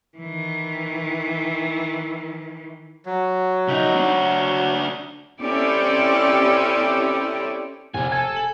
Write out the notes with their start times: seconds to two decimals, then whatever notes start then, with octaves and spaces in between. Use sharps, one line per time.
0.18 D#3 E3
3.06 F#3
3.68 C#3 D#4
3.96 D4 F#4
5.41 C4 C#4 E4 G4 A4 D5
7.94 F1 E2 D3 G#5
8.12 E1 A4 G#5
8.36 F#7